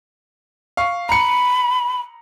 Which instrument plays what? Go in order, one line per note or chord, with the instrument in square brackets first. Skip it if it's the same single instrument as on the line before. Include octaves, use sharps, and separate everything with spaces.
[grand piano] F5 C#6
[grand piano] A#5 C#7 [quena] B5